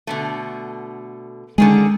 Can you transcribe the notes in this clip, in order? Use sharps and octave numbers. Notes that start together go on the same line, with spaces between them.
B2 D3 A3
D3 D#3 G#3 C#4 G#4